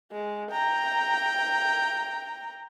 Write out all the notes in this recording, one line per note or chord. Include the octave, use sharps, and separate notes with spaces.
G#3
G5 A#5